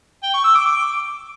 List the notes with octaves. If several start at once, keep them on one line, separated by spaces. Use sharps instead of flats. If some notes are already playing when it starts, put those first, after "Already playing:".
G5
C#6
E6
D6
D6